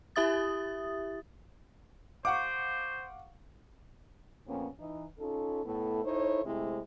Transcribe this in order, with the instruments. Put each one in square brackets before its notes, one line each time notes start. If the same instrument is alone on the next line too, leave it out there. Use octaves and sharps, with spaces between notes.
[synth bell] E4 G4 E5 D#6 A6
[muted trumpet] C5 [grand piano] F5 F#5 C#6 [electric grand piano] D6
[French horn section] F2 A#2 A#3 B3 C#4
E3 D#4
C#4 D#4 F4 A4
A2 A3 B3 E4 A4
D#4 E4 A4 C5 C#5
C3 G#3 A3 C4 E4